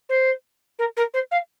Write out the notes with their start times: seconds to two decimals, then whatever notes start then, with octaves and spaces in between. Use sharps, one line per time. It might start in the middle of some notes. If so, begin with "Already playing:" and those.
0.09 C5
0.78 A#4
0.96 A#4
1.13 C5
1.31 F5